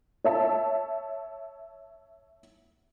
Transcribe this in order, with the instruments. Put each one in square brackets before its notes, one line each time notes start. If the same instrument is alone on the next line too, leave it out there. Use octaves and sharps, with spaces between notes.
[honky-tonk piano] C#5 E5 A5